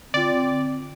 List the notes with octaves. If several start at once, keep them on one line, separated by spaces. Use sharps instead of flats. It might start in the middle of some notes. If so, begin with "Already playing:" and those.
D3 C4 F4 D5